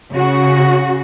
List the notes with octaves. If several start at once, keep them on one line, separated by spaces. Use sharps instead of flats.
C#3 F#4